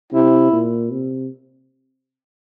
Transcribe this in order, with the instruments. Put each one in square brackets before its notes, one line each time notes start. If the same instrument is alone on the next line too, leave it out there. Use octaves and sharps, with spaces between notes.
[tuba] C3 [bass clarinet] E4
[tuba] A#2
C3